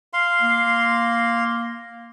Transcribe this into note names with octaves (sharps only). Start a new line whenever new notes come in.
F5 C6
A#3